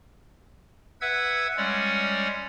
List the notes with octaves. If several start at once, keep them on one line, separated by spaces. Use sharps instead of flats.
B4 E5 F#5 E6 G#6
G3 G#3 C#4 C#5 D5 F#5